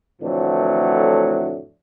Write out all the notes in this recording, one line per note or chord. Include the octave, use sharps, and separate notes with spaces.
F2 A2 D3 E3 F#3 A3